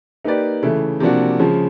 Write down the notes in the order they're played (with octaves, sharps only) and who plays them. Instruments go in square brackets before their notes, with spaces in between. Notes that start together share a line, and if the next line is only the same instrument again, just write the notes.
[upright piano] A#3 D#4 G4 B4 D5
C#3 E3 A3
C3 F3 A#3 D4 F#4
C#3 F3 G#3